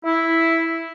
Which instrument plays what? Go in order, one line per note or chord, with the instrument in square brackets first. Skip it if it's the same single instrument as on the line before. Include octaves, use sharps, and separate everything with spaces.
[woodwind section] E4